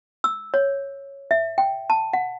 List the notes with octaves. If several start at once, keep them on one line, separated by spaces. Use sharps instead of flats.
E6
C#5
E5
G5
A5
F#5